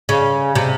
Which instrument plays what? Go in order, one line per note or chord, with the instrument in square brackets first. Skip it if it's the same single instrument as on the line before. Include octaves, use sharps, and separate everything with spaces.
[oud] C#3
C3